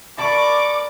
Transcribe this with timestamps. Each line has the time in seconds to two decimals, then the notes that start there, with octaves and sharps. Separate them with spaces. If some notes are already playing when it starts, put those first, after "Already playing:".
0.18 A#4 D5 A5 B5 C#6 D6